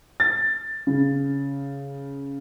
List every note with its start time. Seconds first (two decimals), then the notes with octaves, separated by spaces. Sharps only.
0.20 A6
0.87 C#3